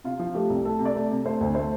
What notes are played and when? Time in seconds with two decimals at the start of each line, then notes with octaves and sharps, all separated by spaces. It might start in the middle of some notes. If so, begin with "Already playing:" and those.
0.04 C3 F4
0.19 F3
0.35 A3 G4
0.50 C2
0.64 A3 A4
0.79 C3
0.85 D5
0.95 A3
1.11 C3
1.26 A3 C5
1.41 D2
1.55 A3 C5